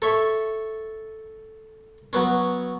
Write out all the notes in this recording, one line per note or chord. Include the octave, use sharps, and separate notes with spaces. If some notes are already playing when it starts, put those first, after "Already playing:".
A4 C#5 E5
F#3 B3 C#4